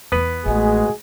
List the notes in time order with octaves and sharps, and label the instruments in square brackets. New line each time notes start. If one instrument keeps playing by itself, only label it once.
[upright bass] E2 E3 [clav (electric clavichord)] B3 B4
[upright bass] A1 A3 [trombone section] G#3 F#4 G#4